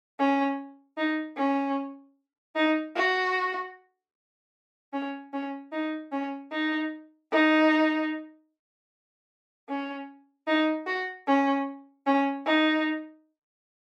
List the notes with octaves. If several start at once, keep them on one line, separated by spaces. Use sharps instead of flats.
C#4
D#4
C#4
D#4
F#4
C#4
C#4
D#4
C#4
D#4
D#4
C#4
D#4
F#4
C#4
C#4
D#4